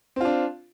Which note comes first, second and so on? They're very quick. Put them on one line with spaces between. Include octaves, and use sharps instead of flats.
C4 F4 D4